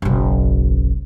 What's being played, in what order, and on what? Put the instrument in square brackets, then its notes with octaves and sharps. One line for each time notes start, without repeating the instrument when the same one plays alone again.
[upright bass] F#1 B1